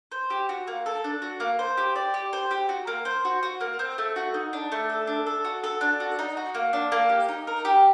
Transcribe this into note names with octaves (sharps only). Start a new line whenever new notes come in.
C5
G4
F#4
A#3
A4
D4
F#4
A#3
C5
G4
D5
G4
C5
G4
F#4
A#3
C5
F#4
F#4
A#3
C4
A3
F#4
D#4
D4
A3
A4
D4
A4
F#4
A4
D4
F#4
D#4
F#4
A#3
D4
A#3
G4
D#4
A#4
G4